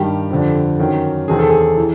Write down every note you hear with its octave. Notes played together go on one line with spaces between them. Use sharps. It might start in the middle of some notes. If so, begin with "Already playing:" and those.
Already playing: G2 D#3 G4
F2 D3
F#2 D#3
E2 C3 D#3 G#4
A4
G#4
E3